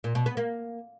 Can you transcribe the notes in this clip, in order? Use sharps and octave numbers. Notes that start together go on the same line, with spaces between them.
A#2
B2
B3
A#3